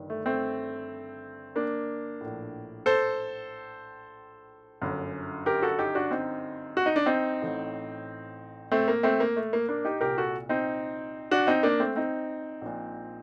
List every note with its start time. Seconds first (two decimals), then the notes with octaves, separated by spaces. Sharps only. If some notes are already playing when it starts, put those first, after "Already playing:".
Already playing: G1 G2 D#3
0.10 A3
0.26 A3 C4
1.56 A#3 D4
2.21 A2
2.26 A#1
2.86 A4 C5
4.81 G1 F#2 D3
5.46 G4 A#4
5.62 F#4 A4
5.79 D#4 G4
5.95 D4 F#4
6.11 C4 D#4
6.77 F#4
6.86 D#4
6.96 D4
7.06 C4 D#4
7.42 A1 A2
8.72 A3 C4
8.88 A#3
9.03 A3 C4
9.20 A#3
9.36 A3
9.53 A#3
9.69 A#3 D4
9.85 D#4 G4
10.01 C2 A#2 G4 A#4
10.18 F#4 A4
10.49 C4 D#4
11.31 D4 F#4
11.47 C4 D#4
11.63 A#3 D4
11.79 A3 C4
11.96 C4 D#4
12.61 A#1 A#2